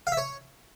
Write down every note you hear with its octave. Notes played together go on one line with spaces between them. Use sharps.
F5
E5
C#5